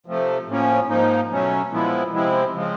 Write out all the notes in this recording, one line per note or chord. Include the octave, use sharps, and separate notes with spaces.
C3 F3 A3
A2 F3 A#3 C#4
G#2 F3 A#3 D#4
B2 F#3 A3 C#4
A#2 F3 G#3 B3 E4
C3 F3 G#3 C4 E4
C#3 F3 G#3 C4